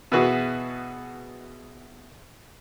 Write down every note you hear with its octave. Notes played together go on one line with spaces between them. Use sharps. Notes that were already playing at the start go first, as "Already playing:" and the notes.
B2 E3 B3 F#4 G#4 B4